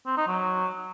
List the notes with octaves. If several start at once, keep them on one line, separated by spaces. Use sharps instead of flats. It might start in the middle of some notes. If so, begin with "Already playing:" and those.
C4
D#4
F#3